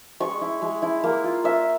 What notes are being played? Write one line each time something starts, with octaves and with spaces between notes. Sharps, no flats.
G#3 C#6
E4
G#3
E4
A#3
F4
A#3 E5